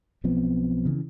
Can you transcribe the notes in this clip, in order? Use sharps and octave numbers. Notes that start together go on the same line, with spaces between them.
B1 F3 B3 C4
C#3 E3